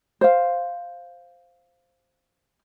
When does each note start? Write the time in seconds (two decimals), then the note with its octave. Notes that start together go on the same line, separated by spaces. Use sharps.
0.21 C5 F5